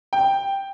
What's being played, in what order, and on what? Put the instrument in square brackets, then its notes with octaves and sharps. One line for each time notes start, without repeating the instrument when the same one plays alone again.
[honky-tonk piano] G5